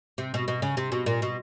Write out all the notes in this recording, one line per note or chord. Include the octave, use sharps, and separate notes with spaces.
C3
B2
B2
C#3
C3
B2
A#2
B2